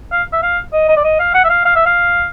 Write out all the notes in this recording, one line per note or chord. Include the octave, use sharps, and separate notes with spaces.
F5
E5
F5
D#5
D#5
D5
D#5
F5
F#5
E5
F5
F5
E5
F5